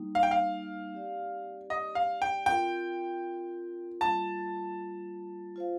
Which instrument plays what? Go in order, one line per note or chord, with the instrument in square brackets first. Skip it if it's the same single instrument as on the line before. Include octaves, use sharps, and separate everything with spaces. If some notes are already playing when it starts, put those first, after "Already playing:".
Already playing: [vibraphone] G3 A#3 D#4
[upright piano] F5
G5
F5
[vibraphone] C4 G4 D5
[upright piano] D#5
F5
G5
[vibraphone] C4 F4 A#4 [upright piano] G5
[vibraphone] G3 A#3 F4 [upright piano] A5
[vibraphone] F4 C5 F5